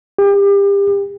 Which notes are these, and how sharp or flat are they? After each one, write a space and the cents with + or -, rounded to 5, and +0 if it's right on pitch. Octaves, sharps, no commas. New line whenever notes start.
G4 +30